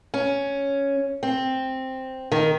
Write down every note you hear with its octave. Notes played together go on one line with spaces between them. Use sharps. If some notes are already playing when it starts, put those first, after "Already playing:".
C#4
C4
D#3